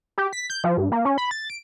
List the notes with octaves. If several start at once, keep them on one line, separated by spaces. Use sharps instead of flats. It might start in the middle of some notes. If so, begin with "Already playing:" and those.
G4
B6
G6
F3
G2
A#3
C#4
B5
A6
D7